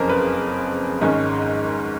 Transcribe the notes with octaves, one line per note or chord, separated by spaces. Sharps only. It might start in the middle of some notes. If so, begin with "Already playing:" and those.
Already playing: F#1 F2 C#3 F3 A#4 C5
B4
G#1 G#2 D#3 G#3 C#4